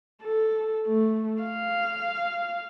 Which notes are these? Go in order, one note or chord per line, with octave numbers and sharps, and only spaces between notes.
A4
A3
F5